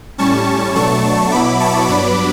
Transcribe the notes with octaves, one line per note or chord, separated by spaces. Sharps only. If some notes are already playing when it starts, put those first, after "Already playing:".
A2 G3 C#4 A5 C#6
B2 F#3 A3 D4 A5 C#6
B2 F#3 B3 E4 B5 D6
A5 C#6
G2 F#3 B3 D4 B5 D6